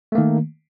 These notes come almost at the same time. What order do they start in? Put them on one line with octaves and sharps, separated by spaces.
A3 A#3 D#3